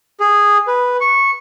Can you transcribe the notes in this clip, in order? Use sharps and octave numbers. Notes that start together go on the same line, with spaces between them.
G#4
B4
C#6